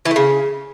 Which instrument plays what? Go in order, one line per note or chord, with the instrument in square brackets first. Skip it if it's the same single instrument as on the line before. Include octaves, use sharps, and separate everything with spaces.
[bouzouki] E3
A3
C#3